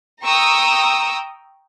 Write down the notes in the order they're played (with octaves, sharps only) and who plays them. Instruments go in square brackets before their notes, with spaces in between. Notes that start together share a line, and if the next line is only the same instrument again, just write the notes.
[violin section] G5 A#5 C#6 D#6 E6